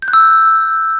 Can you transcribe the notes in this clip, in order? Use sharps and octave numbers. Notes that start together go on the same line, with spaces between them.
G6
F#6
E6